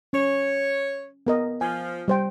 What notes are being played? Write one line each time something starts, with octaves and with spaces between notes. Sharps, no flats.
C#4 C#5
B3 A#4 D#5
F3 G#5
G3 C5 G5